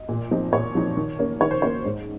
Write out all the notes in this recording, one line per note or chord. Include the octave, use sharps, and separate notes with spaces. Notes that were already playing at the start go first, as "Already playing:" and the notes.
Already playing: D#5
A#2
F3 C4 D#4
A#2 C#5
F3 C4 D#4
D#3
A#3 C#4
D#3 C#5
C5
A#3 C#4 C#5
G#2